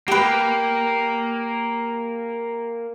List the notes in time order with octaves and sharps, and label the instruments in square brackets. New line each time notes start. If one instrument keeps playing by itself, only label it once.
[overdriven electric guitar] A#3 [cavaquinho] G4 B4